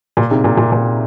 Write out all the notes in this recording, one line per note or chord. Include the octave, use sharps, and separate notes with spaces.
A#2
G#2 C3
A#2
A#2
A#2